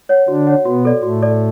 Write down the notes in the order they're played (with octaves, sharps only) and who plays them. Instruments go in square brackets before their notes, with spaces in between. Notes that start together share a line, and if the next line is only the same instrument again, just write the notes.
[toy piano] C#5 F#5
[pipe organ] D3 D4 [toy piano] F#4
[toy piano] C#5 F#5
[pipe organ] B2 B3 [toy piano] F#4
[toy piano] A4 D5
[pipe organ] A2 A3 [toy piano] F#4
[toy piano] A4 D5